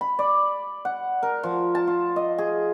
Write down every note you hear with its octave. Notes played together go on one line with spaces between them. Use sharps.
B5
D5
F#5
A#4
F3
A5
F4
D#5
G#4